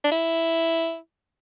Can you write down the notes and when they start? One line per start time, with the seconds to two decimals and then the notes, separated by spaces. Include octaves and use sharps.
0.04 D4
0.12 E4